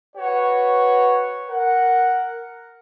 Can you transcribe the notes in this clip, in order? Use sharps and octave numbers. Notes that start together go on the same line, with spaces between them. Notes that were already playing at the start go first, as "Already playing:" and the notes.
F#4 B4 C#5
A#4 F#5